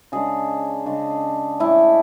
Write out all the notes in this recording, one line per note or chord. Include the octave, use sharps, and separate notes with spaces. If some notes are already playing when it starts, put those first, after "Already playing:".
C#3 G#3 D4 G#4
C#3 G#3 D4
A2 G#3 D4 E4